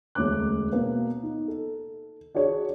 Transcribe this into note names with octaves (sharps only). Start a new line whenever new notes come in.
E1 D2 C#4 D6 F#6
B2 A#3 B3
D#4
A4
D4 F#4 G#4 C#5